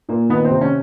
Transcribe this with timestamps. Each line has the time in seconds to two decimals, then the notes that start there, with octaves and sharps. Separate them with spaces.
0.08 A#2 A#3
0.29 D#3 B3
0.45 C4
0.51 C3
0.61 C#4